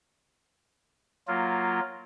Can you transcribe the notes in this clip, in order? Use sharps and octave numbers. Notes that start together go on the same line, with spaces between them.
F#3 A#3 F4